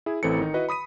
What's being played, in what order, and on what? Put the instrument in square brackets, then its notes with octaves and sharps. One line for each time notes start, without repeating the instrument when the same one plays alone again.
[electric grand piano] E4 G#4
A1 E3 C4 A4 C#7
D#3 D#4
E4 F#4 B4 D#5
B5 D#6 B6 D#7